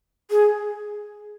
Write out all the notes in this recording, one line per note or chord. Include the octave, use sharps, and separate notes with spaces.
G#4